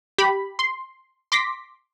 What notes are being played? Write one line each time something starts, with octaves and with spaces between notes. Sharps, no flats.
G4 B5
C6
C6 D6 A#6 B6